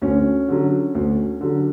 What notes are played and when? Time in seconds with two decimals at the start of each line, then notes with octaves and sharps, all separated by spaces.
0.02 D2 C#4
0.49 D3 F#3
0.95 D2
1.41 D3 F#3